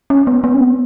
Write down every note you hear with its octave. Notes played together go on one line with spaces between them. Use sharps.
C#4
B3
B3
C#4
B3